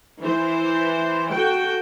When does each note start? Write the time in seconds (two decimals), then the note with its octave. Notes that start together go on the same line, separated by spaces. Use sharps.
0.23 E3 C5
1.32 F#4 A4 G5